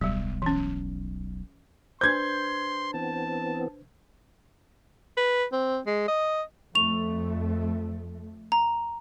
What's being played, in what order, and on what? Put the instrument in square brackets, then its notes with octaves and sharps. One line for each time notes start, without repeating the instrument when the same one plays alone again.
[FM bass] D1 [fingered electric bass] B1 [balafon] F#3 G3
[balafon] E3 C#4
[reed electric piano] D4 B4 C5 [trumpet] C6 [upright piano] G6 G#6
[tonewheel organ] E3 B3 C4 [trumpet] A5
[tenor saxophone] B4
C4
G#3
D#5
[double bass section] F2 A3 [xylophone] C#6 F7
[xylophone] A#5